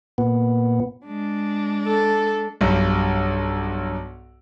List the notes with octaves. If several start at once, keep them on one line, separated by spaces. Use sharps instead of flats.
A#2 B3
G#3 D4
A4
B1 G2